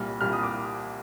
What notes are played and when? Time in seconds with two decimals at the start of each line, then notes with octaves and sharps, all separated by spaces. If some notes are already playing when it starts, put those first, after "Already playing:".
Already playing: C2 A#2 G3 F6
0.21 C2 A#2 G3 F6
0.32 D#6
0.43 D6